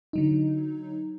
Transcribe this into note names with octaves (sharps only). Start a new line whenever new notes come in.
D3 F#3 D#4